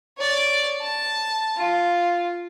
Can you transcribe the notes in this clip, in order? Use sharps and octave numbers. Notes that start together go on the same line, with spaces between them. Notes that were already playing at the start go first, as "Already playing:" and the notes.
C#5 D5
A5
F4